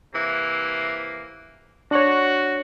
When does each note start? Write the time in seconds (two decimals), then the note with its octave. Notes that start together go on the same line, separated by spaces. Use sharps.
0.14 C3 E3 A#3
1.91 D4 F#4 C#5